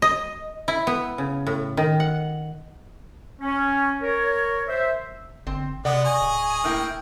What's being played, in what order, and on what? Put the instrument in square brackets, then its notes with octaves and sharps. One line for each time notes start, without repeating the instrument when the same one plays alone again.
[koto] D#5
E4
B3
C#3
A2
D#3
F#5
[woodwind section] C#4
A#4 C#5
C5 E5
[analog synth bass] G1 [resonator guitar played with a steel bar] C4
[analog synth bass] C3 [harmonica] G#3 B3 [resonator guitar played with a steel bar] D5 F#5
[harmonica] G#4 C#5 D#5 [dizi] G#5
[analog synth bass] D1
[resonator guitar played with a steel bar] A2 A#3 E4 [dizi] G5